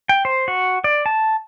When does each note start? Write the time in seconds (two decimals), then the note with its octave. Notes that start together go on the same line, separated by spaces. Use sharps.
0.09 G5
0.25 C5
0.48 F#4
0.84 D5
1.06 A5